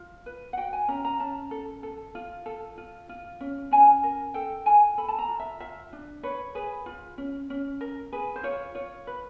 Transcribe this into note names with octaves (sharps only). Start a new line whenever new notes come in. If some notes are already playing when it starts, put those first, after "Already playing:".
Already playing: F4
B4
F#5
F#4 G5
G#5
C#4 A#5
A#5
C#4 A5
A4
A4
F4
A4
F4
F4
C#4
C#4 G#5
A#4
A4 G5
F4 G#5
A4 B5
A5
A#5
F4
E5
F4 E5
D4
B4 C#5
G#4 B4
F4
C#4
C#4
A#4
G#4 B4
C5
F4 C#5
F4 C#5
B4